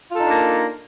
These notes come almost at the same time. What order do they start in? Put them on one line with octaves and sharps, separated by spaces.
F4 A4 D#4 D4 A#3